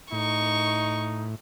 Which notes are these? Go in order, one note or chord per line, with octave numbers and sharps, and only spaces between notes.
A2 D#4 C#6